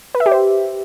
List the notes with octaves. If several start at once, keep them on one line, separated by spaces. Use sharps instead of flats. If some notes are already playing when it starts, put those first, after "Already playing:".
B4
E5
G4
C5